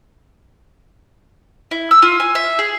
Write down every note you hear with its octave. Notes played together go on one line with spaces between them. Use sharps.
E4
E6
F4
G#5
E5
G#4